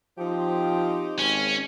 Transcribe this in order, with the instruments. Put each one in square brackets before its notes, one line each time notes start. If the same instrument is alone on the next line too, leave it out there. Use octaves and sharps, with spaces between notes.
[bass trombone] F3 [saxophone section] C4 D#4 G4
[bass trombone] G#1 [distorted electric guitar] C#4